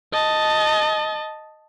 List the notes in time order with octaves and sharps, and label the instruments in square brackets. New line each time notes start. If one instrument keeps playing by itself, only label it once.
[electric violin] D#5 A5